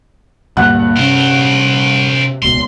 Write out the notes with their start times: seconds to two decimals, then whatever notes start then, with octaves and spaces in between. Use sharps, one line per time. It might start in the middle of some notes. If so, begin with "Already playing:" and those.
0.57 D2 G2 A#2 A#3 F#5 F#6
0.97 C3 C#4 A#4 C5
2.43 D#1 C#2 B2 C6